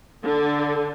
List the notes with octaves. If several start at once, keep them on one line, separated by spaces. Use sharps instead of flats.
D3